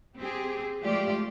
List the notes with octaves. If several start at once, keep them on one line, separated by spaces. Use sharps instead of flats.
C4 G4 G#4
F3 G#3 A3 F4 G4 D5